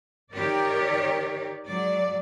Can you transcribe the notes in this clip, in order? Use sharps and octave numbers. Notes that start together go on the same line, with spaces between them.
D#3 G4 A#4 C#5 D5
F#3 G#3 D5